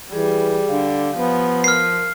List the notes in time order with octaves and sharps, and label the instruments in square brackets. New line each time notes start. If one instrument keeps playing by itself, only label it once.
[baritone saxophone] E3 [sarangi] G3 [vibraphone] G#4
[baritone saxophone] D3 [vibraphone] F5
[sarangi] F3 [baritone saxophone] B3
[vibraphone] A#4 [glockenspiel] F6 C7